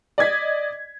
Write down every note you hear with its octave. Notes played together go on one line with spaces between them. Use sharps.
D5 D#5 G#6 B6